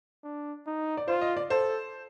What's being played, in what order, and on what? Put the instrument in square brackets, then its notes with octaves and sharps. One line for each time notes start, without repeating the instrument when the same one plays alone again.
[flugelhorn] D4
D#4
[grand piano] D5
[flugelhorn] F4 [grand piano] C5
[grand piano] D#5
D5
[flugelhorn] A4 [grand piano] C5